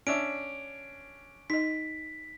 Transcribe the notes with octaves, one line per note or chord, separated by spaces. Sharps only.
C#4 D4 E5 D7
D#4 D#5 B6